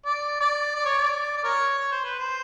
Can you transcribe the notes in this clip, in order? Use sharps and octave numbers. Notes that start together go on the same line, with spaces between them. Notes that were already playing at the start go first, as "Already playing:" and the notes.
D5
D5
D5
C#5
D5
D5
A#4 C#5
C#5
C5
B4
C5